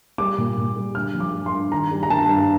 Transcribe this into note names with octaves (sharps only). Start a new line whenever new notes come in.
G3 D6
A#2
A#2
G3
D3 F6
F3
D6
G2
C6
G2
D#3 A#5
G3
A#5
G2 A5
G2